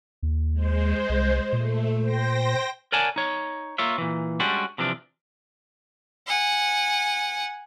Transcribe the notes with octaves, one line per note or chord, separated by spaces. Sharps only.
D#2
G#3 C5
C2
A#2 A3
C5 G5 A#6
A#4 C#5 D5 F#5 G#5 A5
D#4 C#5
A#3 F4 C#5 E5
A#2 E3
G3 G#3 C#4 D4 F#4
C3 E3 F3 D4
F#5 G#5